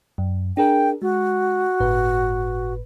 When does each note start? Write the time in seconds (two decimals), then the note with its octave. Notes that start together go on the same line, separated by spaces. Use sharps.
0.18 F#2
0.57 D4 G#4 A#4 G5
1.02 G#3 F#4
1.80 G1 A2 B4